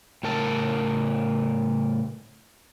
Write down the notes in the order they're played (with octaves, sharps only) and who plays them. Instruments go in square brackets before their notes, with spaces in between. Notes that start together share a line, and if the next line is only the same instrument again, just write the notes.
[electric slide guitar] A2 C#3 A#4 A5